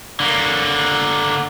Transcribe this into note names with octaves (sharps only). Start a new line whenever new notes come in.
D3 A#3